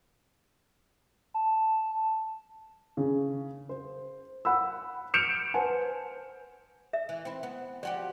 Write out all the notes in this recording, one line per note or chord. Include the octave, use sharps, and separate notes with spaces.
A5
C#3
C5
F#5 B5 E6
F6 G6 C#7 D7 E7 F7
B4 C5 F#5 G#5 A5
E5
E3
C4 E4
B3
F3 F#4 G4 D5